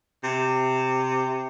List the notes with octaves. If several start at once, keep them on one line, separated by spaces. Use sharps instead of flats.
C3